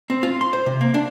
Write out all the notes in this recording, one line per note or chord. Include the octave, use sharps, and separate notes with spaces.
C4
F4
C6
C5
C3
A#3
D4